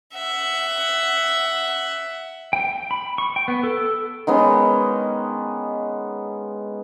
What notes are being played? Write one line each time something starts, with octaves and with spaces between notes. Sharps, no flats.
E5 F#5
G5
B5
C#6
G5
B3
A4
D#3 G#3 B3 C#4